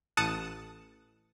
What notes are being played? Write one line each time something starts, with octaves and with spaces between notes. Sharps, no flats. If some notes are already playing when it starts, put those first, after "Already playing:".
A1 A5 D#6 F#6 C#7